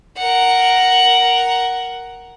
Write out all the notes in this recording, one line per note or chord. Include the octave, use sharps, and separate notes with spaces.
A#4 F#5